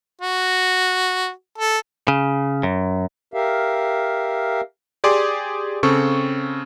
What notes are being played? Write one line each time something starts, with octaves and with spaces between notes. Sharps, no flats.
F#4
A4
C#3
F#2
G4 A#4 E5 F5
G4 G#4 D5 C6 D6
C#3 C4 A4 C#6